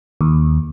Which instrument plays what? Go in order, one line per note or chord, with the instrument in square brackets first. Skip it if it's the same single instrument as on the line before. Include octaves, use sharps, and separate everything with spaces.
[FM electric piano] D#2